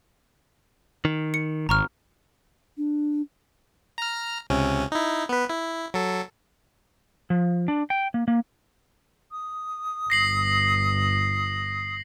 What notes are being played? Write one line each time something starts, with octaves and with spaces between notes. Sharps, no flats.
D#3
C#7
G#1 A#5 C#6 F6
D4
A#5 F6
C#2 C3 C#4
D#4 E4
B3 B4
E4
F#3 A4
F3
D4
G5
A#3
A#3
D#6
G1 A#6 C7 F#7